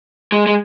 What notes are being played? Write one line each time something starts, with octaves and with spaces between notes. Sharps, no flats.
G#3
G#3